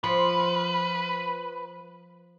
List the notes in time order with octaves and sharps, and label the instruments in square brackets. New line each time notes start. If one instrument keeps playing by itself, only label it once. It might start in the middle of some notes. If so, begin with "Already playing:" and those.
[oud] F3 [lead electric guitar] B4